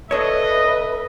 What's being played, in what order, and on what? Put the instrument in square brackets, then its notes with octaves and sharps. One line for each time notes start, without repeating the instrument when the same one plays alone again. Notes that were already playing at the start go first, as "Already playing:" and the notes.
[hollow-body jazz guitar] D4 A4 C#5 [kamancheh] B4 E5 [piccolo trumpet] D#5